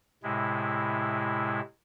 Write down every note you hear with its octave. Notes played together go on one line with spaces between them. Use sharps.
A2 C3 G#3 E4